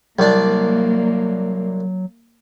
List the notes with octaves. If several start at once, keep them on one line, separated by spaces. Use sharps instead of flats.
C2 F#3 A#3 D4